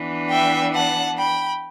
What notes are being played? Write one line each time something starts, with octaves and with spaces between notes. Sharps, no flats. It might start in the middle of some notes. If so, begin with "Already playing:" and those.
Already playing: E3 B3 D4
E5 G5
F#5 A5
G5 B5